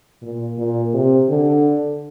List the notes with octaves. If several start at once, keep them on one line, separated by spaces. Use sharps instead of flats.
A#2
A#2
C3
D3